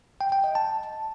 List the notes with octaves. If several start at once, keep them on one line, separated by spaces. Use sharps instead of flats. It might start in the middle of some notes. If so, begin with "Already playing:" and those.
G5
G5
D#5
A5